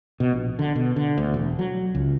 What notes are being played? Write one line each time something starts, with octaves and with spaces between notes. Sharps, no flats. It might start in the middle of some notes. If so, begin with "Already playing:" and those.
B2
A#1
D3
B2
D3
D2
E1
F#3
C#2